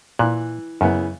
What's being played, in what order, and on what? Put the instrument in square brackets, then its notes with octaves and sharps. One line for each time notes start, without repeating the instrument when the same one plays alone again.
[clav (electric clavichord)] A#2 [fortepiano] E3 F#6
[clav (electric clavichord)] F#2 [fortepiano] C#3 E3 B3